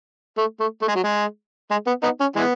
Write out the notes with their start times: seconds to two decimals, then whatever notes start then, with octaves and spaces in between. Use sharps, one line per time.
0.37 A3
0.60 A3
0.81 A3
0.88 G#3
0.95 F#3
1.04 G#3
1.70 G#3
1.86 B3
2.03 B3 D#4
2.20 C#4
2.36 E3 G#3 B3